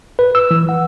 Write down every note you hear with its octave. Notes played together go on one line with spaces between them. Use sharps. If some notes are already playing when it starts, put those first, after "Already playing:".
B4
E6
E3
F#5